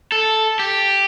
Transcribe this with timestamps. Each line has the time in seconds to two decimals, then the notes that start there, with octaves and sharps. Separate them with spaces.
0.12 A4
0.59 G4